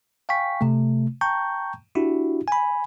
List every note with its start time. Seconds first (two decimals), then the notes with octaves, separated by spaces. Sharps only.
0.29 F5 G5 G#5 C#6 B6
0.61 C3 A3
1.21 G5 A5 A#5 C#6 G6
1.95 D4 E4 F#4 G4
2.48 G#5 B5